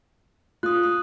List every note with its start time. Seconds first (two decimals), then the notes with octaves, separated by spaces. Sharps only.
0.63 F4 D#6 F#6
0.83 D#6